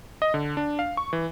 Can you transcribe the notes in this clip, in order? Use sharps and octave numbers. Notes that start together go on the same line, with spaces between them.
D#5
D3
D4
F5
C#6
E3